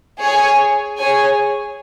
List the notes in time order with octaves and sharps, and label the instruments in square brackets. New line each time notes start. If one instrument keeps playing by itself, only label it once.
[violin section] G#4 C#5 G#5
G#4 C#5 G#5